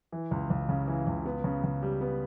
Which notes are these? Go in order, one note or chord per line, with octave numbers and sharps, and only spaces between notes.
E3
C#2
C#2
C#3
E3
C#2
B3
C#3
C#3
G3
B3